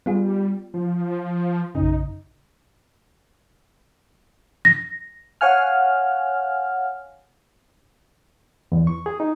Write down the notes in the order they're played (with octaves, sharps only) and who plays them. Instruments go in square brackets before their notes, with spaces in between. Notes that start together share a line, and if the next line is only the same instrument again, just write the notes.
[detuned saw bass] G3 [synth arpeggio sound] B3 F4 G#4
[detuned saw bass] F3
[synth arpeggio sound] A#1 F#2 C#3 [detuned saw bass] D#4
[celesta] A#6
[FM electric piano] C#5 F5 F#5 G#5 F6
[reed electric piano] E2
C#6
G#4
D#4